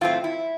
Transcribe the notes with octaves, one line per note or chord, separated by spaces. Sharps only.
A2 F#3 A3 C4 F4
E4